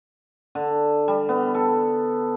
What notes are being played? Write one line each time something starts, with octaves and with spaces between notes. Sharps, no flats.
D3
G3
B3
A4